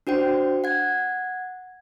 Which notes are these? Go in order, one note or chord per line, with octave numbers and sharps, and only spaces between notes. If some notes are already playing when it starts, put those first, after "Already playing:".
D4 F#4 C5 G5
F#5 G#6